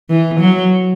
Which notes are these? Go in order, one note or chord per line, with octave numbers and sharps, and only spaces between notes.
E3
F#3